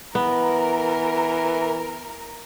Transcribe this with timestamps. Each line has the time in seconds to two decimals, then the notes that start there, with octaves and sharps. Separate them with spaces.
0.15 E3 B3 A#4